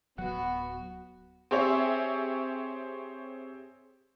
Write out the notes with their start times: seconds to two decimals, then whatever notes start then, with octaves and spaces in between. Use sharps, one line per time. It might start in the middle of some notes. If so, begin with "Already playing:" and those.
0.18 D1 F#3 B3 F#4 F#5
1.51 C4 G4 G#4 C#5 E5